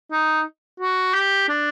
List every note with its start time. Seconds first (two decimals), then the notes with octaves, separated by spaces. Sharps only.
0.12 D#4
0.80 F#4
1.14 G4
1.49 D4